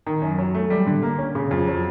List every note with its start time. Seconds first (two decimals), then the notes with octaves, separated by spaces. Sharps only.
0.06 D#3
0.22 F#2
0.38 F#3
0.55 A3
0.70 G3
0.87 D3
1.03 A#3
1.18 C#4
1.35 C#3
1.51 F2
1.68 F#3